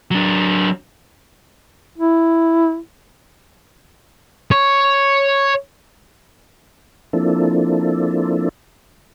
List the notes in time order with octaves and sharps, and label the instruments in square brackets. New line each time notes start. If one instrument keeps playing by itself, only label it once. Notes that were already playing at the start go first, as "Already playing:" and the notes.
[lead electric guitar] F#3 D4
[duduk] E4
[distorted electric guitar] C#5
[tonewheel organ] F3 A#3 C4 D4 E4 A4